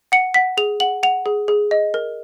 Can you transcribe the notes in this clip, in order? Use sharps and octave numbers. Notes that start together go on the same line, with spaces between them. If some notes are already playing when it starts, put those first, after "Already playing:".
F#5 C#7
F#5 B6
G#4 F7
F#5 F#7
F#5 F7
G#4
G#4
D#5
A#4